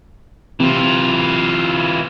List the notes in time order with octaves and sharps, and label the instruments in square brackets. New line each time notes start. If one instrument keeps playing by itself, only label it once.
[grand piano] C3 [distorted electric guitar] E3 F4